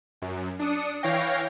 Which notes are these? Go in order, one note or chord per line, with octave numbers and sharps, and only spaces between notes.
F#2
D4 D#6 C#7
E3 C#5 F5 G5 A#6